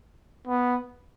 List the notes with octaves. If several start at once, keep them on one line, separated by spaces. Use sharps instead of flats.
B3